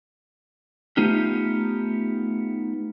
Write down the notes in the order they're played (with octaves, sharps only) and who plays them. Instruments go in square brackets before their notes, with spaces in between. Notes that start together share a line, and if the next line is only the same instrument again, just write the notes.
[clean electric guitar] A3 B3 D#4 F4 G4